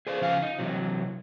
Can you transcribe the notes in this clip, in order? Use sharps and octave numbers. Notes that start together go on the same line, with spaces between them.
G#4 C5 D5
C#3 F3 F5 G#5
D#4
C3 E3 F#3